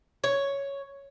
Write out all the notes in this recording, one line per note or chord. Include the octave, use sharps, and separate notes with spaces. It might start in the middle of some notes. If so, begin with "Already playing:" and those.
C#5